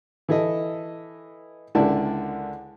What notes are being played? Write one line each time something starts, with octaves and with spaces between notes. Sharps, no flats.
E3 E4 A4 D#5
C#2 D3 E4 A#4 D5 A5